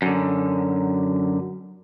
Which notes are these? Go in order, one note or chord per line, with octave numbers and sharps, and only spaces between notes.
F#2 D3